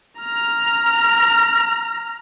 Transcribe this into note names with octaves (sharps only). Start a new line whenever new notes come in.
A#5 F6